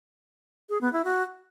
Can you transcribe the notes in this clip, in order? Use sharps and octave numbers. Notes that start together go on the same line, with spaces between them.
G#4
B3
E4
F#4